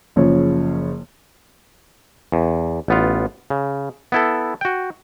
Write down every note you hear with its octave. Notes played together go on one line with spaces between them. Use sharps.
F#1 C#3 F3 C#5
E2
A1 B3 F4
C#3
B3 E4 A4
F#4 G5